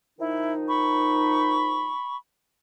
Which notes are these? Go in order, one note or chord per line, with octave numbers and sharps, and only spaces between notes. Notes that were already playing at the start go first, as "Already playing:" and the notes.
D#3 F3 D#4 E4
B5 C#6